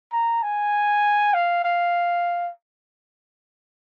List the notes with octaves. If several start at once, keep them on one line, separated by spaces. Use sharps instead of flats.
A#5
G#5
F5
F5